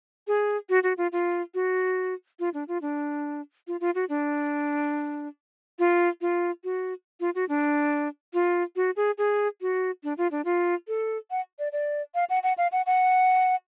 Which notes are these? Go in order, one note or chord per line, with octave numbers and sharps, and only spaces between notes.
G#4
F#4
F#4
F4
F4
F#4
F4
D4
F4
D4
F4
F4
F#4
D4
F4
F4
F#4
F4
F#4
D4
F4
F#4
G#4
G#4
F#4
D4
F4
D4
F4
A4
F#5
D5
D5
F5
F#5
F#5
F5
F#5
F#5